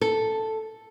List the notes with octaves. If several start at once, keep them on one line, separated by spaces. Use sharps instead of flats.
A4